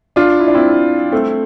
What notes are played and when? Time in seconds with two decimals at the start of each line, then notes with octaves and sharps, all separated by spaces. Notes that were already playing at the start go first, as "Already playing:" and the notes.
0.16 D4 F4
0.40 E4
0.47 D4
0.55 C4 E4
1.12 A3 C4